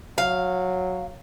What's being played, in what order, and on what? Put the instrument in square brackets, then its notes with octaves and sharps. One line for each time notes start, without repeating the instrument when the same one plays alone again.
[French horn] F#3 [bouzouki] F5